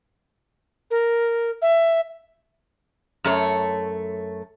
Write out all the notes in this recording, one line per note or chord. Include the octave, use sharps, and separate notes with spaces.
A#4
E5
F#2 A3 C#5